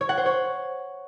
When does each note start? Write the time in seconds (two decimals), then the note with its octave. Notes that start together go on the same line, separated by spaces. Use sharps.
0.01 C#5
0.09 F#5
0.17 C5
0.26 C#5